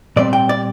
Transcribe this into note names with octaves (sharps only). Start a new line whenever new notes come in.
A#2 G3 C4 D5
G5
D5